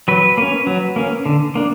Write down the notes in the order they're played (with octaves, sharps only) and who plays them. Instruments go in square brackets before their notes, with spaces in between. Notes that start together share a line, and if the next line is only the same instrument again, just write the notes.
[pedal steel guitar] F#3 B4
A#3 C#4
F#3
A#3 C#4
D3
A#3 D4